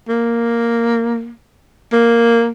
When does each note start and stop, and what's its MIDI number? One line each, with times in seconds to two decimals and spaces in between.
0.09 1.32 58
1.93 2.50 58